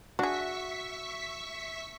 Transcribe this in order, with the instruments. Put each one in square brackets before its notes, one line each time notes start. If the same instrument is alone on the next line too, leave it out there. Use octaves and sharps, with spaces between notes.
[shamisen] D4 G#4 [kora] F#4 [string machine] E5 C#6 B6